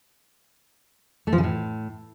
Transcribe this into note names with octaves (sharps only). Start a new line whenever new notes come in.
A3
F3
C#3
A2